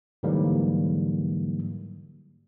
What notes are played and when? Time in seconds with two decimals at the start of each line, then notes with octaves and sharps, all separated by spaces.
0.23 G#2 D3 E3 F#3 G3 A#3